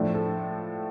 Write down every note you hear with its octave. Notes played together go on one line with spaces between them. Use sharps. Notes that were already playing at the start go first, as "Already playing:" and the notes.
Already playing: A2 F3 A3 D4
A4